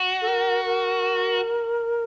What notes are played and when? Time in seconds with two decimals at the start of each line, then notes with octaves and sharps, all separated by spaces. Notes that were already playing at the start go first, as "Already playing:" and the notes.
Already playing: F#4
0.22 A4
0.28 A#4
0.65 A#4